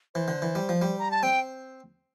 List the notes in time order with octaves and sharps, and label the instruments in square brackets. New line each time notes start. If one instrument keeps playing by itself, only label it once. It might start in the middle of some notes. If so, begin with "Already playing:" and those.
[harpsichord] E3 [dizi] C5
[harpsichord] D3
E3
G3
F3
G3
[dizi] A#5
A5
[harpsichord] C4 [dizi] G5